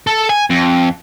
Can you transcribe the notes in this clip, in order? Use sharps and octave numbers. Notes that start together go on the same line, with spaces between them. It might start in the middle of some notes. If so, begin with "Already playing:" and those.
A4
G#5
F2